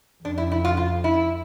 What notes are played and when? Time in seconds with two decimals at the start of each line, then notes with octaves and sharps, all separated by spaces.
0.24 F2 D4
0.38 E4
0.52 E4
0.65 F4
0.77 F4
1.04 E4